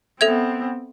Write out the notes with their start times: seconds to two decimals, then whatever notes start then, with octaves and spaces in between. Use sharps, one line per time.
0.21 B3 C4 A4 E5 G#6